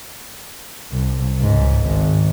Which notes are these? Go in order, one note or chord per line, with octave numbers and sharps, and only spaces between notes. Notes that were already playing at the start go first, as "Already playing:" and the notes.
C2
C#2 G#2
G#1